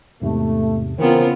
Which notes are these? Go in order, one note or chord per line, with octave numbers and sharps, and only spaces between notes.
E2 G#2 C3 A3
C#3 E3 B3 C4 F4 A#4